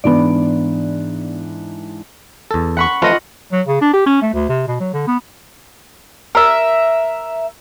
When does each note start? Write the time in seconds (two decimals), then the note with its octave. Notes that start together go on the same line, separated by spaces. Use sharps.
0.04 G#2 E3 B3 D4 D5
2.51 E2 A4
2.77 F#5 B5 C#6
3.02 F3 A3 F4 B4 D#5 F#5
3.52 F#3
3.67 C#3
3.81 D4
3.93 G4
4.06 C#4
4.22 A3
4.33 D2
4.49 C3
4.67 B2
4.80 F#3
4.93 D3
5.07 B3
6.35 A#4 E5